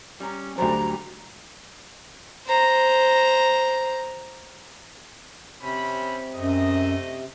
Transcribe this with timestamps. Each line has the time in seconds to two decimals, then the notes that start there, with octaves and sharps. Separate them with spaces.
0.20 G3 C#4 A#5
0.58 D2 F#3 G3 D4 F#4 G4 C5 A#5
2.46 C5 A#5
5.62 C3 C4 C#4 B5
6.36 F#2 A3 C4 D#5